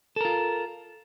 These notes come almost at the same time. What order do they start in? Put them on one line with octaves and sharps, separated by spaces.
A4 A#4 F4